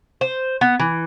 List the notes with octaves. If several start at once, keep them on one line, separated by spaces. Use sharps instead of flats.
C5
B3
E3